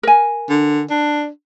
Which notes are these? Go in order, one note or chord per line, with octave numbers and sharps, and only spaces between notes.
A#4 G#5
D3
D4